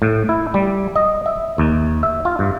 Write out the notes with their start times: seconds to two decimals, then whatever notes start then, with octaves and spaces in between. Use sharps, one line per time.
0.02 A2
0.29 E4
0.54 G3
0.96 D#5
1.26 E5
1.58 D#2
2.03 E5
2.25 F4
2.39 G2